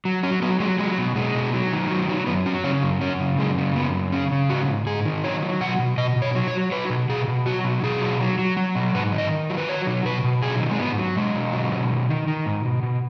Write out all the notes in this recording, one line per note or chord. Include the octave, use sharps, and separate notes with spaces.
F#3
F#3 C#4
F#3 B3
F#3 G#3
F#3 G#3
B2
B2 G#3
B2
F#3
D#3
F#3
F#3
F#2 B3
F#3 C#4
C#3 C#4
F#2
F#2 C#4
C#3
F#2 G#3
C#3
F#2 B3
C#3
C#3 C#4
C#3
G#2 F#4
G#2
G#2 G#4
D#3
F#3 C#5
F#3
B2 F#5
B2
B2 D#5
B2
C#5
F#3
C#5
F#3
F#3 B4
B2
B2 G#4
B2
F#3 F#4
B2
B2 G#4
F#3
F#3
F#3
F#3
B2
G#2 B4
D#3
D#5
D#3
F#3
B4
F#3 C#5
B2
B2 B4
B2
F#3 G#4
D#3
G#3
G#2 B3
F#3
B2 G#3
B2
F#3
B2
D#3
D#3
D#3
G#2
B2
B2